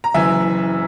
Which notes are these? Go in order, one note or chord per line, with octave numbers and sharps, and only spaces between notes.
A#5
F#1 F#2 E3 E5 G#5